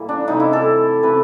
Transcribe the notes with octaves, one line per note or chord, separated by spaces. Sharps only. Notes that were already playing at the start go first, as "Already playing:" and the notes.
Already playing: A2 E3 G3 A#3
D4
C3 E3 A3 D#4
E4
A4
C3 E3 A3 B4